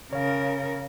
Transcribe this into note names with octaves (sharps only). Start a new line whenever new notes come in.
C#3 A#4 C#5 F5